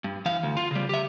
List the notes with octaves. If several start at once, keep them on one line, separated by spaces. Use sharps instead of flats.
G2
E3 F5
D2
F4
C#3 G3
G4 E5